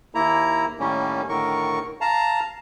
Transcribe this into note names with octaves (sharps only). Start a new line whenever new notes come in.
D#2 A#3 E4 A#5
A2 D#3 G3 A#3 C#4
A2 D3 D#3 A#4 C#6
F5 A5 A#5